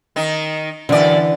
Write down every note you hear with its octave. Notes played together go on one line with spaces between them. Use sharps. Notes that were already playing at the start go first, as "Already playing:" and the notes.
D#3 D#4
F#2 D3 E3 D5